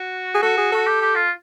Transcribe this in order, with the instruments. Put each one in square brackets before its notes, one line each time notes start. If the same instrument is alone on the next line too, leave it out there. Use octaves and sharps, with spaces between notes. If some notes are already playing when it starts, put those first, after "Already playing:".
Already playing: [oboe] F#4
[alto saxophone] G#4
[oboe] F#4 [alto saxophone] A4
[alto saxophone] G#4
[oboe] F#4 [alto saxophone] A4
[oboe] G4
G4
F4